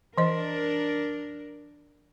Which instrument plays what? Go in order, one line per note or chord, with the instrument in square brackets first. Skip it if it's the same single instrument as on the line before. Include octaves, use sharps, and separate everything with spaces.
[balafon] E3 D#5 [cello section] D4 A#4